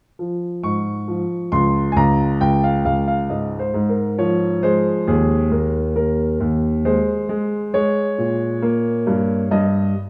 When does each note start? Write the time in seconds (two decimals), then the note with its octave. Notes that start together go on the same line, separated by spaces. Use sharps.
0.19 F3
0.63 G#2 C#6
1.08 F3
1.52 C#2 C6
1.92 G#5
1.96 C#2 A#5
2.41 C#2 G5
2.64 F5
2.85 C#2 F5
3.08 F5
3.29 G#2 D#5
3.59 C5
3.74 G#2
3.89 A#4
4.18 F3 C#5
4.63 G#3 C5
5.07 D#2 G#4
5.51 D#2 A#4
5.96 D#2 A#4
6.40 D#2
6.85 G#3 C5
7.29 G#3
7.74 G#3 C#5
8.18 A#2
8.62 A#3
9.07 G2
9.51 G2 D#5